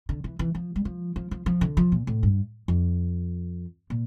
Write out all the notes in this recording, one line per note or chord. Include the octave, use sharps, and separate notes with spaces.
D3
E3
E3
F3
G3
F3
F3
F3
F3
D3
F3
A#2
A2
G2
F2
A#2